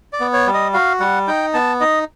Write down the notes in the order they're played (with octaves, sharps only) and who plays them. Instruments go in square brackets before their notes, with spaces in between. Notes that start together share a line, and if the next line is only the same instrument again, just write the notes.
[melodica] D5
B3
C#5
G3
D#5
F#4 F5
G3 F#5
D#4 G5
B3 A5
D#4 D#5